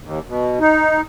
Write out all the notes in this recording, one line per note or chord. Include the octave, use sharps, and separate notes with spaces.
D#2
B2
D#4